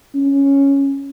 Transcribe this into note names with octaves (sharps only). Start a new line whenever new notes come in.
C#4